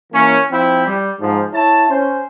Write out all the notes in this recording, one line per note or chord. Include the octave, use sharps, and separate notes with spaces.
E3 A#3 C#4
F3 C4 E4 G5
G3
G#2 F3
E4 C#5 A5
C#4 C5